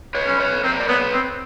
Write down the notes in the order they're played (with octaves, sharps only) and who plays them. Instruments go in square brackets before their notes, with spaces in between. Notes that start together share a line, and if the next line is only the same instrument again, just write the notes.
[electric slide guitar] B4 C#5
[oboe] C#4
[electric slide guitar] B4 C#5
[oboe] C4 [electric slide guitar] A#4 C5
[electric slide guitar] D5
[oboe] B3 [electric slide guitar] B4 C#5
[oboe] C4